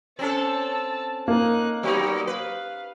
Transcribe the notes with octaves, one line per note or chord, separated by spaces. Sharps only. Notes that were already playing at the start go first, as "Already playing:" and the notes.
C4 C#4 A4 A5 E6
A#3 D#4 F#6
F#3 G3 B3 D#4 C#5
B4 F5